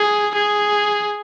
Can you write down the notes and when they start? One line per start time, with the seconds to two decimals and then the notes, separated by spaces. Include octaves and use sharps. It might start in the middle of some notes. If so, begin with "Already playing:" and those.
Already playing: G#4
0.35 G#4